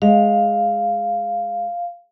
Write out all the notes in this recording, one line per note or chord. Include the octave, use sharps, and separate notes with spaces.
G#3 F5